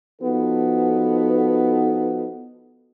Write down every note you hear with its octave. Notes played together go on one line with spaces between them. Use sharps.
F3 B3 D#4 F#4 A4 B4